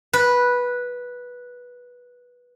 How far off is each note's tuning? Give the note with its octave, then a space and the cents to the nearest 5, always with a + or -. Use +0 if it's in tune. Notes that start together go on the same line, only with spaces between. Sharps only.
B4 -10